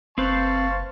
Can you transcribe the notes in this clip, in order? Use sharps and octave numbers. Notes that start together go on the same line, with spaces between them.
F#1 C4 B4 C5 F5 A5 C#6